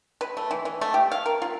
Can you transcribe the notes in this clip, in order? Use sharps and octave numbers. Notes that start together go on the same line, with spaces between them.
B4
A3
E3
E3
A3
G4
F5
A#4
F4